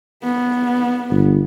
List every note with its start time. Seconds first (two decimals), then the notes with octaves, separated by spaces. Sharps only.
0.23 B3
1.10 G1